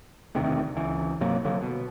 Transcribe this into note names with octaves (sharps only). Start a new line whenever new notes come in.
E1 D2 C3 D#3
C#2 E3
G1 C3 F#3 A#3
C2 D3 F#3 A#3
B2